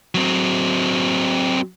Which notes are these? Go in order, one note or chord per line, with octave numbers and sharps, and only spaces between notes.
F#3 C4